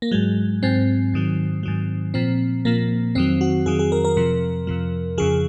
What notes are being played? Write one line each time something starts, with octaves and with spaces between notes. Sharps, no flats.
A#3
G#2 F#3 G#3
G#2 F#3 C4
G#2 D#3 F#3
G#2 D#3 F#3
A#2 F3 C4
A#2 F3 A#3
F2 D#3 F#3 C4
F#4
F2 D#3 F#3 G#4
G#4
A#4
A#4
F2 C3 F3
F2 C3 F3
F2 C#3 F3 G#4